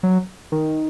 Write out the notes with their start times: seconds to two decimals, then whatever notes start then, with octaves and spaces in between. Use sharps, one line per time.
0.03 F#3
0.52 D#3